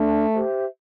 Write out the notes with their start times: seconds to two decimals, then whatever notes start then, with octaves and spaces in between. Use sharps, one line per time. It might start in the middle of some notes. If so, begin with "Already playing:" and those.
Already playing: A3 D4
0.33 G4 C5 E5